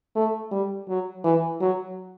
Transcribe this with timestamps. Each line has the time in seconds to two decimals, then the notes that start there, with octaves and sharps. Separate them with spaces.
0.16 A3
0.51 G3
0.88 F#3
1.24 E3
1.61 F#3